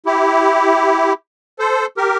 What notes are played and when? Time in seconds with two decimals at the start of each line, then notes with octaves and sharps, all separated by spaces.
0.06 E4 G4
1.59 A4 C5
1.97 G4 A#4